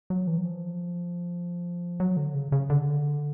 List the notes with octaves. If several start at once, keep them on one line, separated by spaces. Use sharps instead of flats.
F#3
E3
F#3
F3
F#3
D3
C#3
C#3
D3